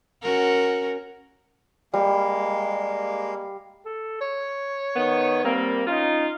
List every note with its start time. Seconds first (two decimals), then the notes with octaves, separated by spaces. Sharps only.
0.22 C#4 F#4 A#4
1.94 G3 G#3 A#3 F5
3.86 A4
4.21 C#5
4.96 D#3 B3
5.44 G3 A#3 C4
5.87 C#4 D#4 F4